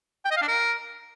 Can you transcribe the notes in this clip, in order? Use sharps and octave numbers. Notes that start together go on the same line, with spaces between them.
G5
D#5
F5
D4
A#4